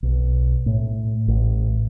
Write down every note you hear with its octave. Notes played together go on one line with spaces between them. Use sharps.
B1
A2
A1